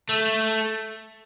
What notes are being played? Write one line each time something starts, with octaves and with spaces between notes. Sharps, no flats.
A3